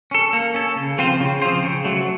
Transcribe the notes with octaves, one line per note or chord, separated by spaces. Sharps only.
C#4 A4
A#3
C#4 A4
C#3
F3 C4 F4 C5
C#3
F3 C4 F4 C5
C#3
F#3 A3